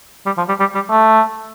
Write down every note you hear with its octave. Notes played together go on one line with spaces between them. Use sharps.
G3
F3
G3
G3
G3
A3